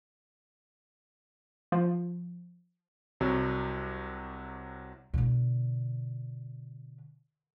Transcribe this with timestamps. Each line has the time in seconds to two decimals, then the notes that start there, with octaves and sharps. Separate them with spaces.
1.72 F3
3.20 C2 C3 F#3
5.14 B2 D3